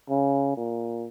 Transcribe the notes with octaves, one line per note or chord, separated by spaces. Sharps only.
C#3
A#2